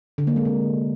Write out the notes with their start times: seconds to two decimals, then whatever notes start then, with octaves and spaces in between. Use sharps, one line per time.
0.18 D3
0.27 A#3
0.36 G#3
0.45 C3